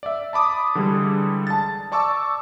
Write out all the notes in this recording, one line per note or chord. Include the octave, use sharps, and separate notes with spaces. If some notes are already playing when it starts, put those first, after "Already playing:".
D5 E5
A5 B5 D6 D#6
D3 E3 G3 G#3 G#4
A5 A6
D5 A5 C#6 D6 E6